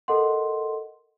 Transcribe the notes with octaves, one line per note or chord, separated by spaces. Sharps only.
A4 A#4 D#5 F#5 C6